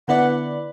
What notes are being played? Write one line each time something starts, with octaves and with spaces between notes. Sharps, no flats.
D3 B3 E4 B4 D5 F#5